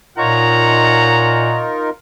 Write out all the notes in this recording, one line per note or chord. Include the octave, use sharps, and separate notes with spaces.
A#2 D#4 F4 A#4 C#5 F#5 A#5